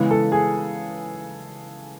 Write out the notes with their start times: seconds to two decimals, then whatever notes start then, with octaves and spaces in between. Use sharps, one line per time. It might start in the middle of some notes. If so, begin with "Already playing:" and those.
Already playing: C#3 E3 G#3 B3 B4
0.11 A4
0.32 G#4